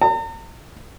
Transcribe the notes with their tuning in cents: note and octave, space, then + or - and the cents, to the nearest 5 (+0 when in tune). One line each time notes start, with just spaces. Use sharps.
A#5 -45